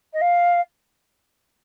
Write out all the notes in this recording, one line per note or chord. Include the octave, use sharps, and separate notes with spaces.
D#5
F5